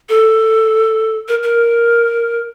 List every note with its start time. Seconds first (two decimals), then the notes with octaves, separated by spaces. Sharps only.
0.09 A4
1.28 A#4
1.43 A#4